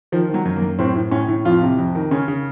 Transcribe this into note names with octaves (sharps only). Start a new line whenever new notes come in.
D#3 F3
D#3
F#3
F#2
A#3
F#2
A2 C4
A2
A2 C#4
A2
F2 F4
C3
F2
D#3
C#3 C#4
C#3